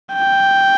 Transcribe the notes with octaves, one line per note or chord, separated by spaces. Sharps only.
G5